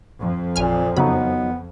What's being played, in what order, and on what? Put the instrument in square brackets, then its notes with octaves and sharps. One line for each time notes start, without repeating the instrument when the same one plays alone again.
[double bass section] F2
[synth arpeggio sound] A1 G#5 F6 [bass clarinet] A#2
[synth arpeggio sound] C#3 B5 [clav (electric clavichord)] F#3 D#4 [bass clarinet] B3